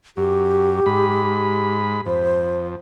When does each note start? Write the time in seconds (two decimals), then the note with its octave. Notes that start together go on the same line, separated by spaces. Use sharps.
0.17 F#2 G4
0.86 G#2 B5
2.06 F2 C5